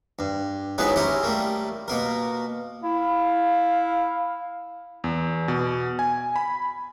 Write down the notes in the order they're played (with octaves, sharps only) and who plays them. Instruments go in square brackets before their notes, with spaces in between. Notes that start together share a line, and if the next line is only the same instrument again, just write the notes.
[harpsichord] G2
A1 G#2 F#3 B3 G#4 B4
C#4 E4 G4 C5 A#5
G3 A3 A#3
B2 A#3 A#4
[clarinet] E4 [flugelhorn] F5
[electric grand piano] E2
B2
G#5
B5